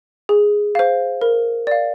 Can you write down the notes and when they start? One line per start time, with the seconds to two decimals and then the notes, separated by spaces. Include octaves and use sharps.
0.29 G#4
0.75 C5 F5
1.21 A#4
1.67 D5 F5